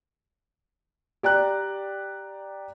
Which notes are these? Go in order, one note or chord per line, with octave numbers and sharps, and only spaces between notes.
G4 D5 A#5 F#6